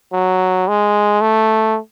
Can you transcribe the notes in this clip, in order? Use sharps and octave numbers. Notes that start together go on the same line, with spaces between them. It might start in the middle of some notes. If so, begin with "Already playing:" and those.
F#3
G#3
A3